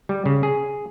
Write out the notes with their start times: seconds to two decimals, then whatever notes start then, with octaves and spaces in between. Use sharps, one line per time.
0.09 G3
0.26 C#3
0.43 G#4